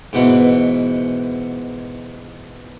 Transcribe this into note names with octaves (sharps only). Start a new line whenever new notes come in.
G#2 B2 E3